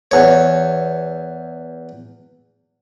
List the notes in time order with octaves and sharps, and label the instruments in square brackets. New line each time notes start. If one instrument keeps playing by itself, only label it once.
[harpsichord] E2 C#5